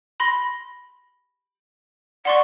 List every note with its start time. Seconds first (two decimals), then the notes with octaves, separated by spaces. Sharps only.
0.20 B5 C6 A#6
2.25 D5 F#5 C6 C#6